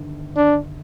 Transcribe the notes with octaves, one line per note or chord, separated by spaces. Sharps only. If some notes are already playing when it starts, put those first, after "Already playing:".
Already playing: G1 G2 D#3
D4